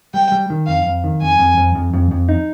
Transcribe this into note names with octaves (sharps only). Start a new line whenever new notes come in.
G3 G5
G3
D#3
F2 F5
F2
D#3
F2 G#5
F2
F2
F2
F2
F2
D#4